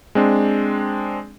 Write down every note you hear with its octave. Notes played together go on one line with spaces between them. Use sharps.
G#3 C4 D4